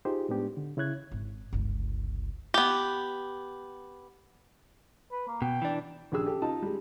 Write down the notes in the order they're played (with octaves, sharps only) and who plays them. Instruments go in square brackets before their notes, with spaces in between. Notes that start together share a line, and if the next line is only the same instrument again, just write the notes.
[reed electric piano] D#4 F4 G4 G#4 C5
A2 G#3 B3 D4 G4
D3
C#3 E4 C#5 F#6 G#6
[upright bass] G#1
G1 C#2
[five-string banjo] B3 G4
[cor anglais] B4
A#3
[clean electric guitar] B2 [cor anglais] G5
[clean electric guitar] E3 D4
[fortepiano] A#1 D4 G4 G#4 E6
G4 A4
D#4 F4 A5
G3 G#3